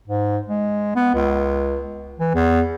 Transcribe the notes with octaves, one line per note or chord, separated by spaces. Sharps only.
G#2
G#3
B3
C#2
E3
E2